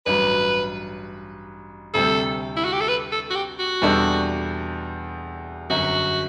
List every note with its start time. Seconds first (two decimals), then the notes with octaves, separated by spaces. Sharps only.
0.06 A1 G2 F#3 B4
1.94 D2 C3 G3 A4
2.57 E4
2.65 F#4
2.73 G4
2.80 A4
2.89 B4
3.12 A4
3.30 F#4
3.35 G4
3.59 F#4
3.82 E2 B2 G3 D4 A4
5.70 G1 F#2 F#3 F#4